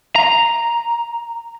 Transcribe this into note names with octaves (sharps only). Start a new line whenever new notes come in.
A#5